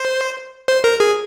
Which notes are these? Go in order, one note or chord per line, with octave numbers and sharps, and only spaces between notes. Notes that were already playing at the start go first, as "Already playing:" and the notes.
Already playing: C5
C5
A#4
G#4